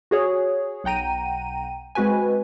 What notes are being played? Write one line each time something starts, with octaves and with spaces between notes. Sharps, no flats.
F#4 G#4 C#5
B1 F#5 G5 A#5 D#7
G#3 C4 F#4 B4 G#5